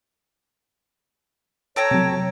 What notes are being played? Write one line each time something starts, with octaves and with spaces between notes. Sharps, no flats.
A4 C#5 G5 A#5
C3 F#3